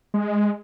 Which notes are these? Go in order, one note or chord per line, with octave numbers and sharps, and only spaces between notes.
G#3